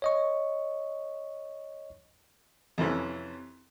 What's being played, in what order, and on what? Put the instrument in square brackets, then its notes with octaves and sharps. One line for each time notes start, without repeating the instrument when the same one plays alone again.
[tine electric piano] C#5 D#5 C#6
[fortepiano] F2 C3 E3 C#4